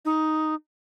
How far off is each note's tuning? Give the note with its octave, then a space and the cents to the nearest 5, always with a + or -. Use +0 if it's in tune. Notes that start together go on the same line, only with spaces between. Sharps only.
D#4 +5